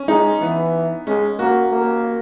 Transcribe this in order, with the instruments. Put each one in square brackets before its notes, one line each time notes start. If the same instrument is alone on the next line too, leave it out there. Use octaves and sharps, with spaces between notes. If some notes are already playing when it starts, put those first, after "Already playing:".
Already playing: [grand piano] C#4
[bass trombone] G#3 [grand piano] D#4
[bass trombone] E3 [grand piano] B3
[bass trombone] G#3 [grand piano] C#4
[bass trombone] A#3 [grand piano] F#4
[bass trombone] A#3